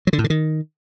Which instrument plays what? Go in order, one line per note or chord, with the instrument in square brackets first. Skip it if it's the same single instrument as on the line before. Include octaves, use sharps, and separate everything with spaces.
[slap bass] F#3
D3
A2
D3
D#3